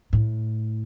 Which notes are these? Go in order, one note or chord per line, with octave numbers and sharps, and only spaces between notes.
A2